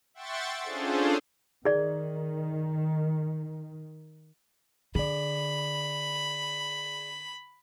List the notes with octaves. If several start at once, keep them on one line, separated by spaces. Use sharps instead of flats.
E5 F#5 G5 C6 C#6 A6
C#4 D4 F4 G#4 A4 C5
D#3 G#4 D5
D3 G#4 D5 B5